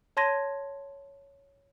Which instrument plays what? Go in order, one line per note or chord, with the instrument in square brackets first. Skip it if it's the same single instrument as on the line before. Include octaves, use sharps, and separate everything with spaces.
[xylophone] C#5 A5 C6 G#6 A#6 D#7